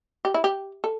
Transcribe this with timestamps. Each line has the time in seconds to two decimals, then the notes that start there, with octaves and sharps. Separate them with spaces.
0.25 G4
0.34 E4
0.44 G4
0.84 A4